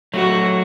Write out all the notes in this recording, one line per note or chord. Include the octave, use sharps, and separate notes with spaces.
F#3 A3 F#4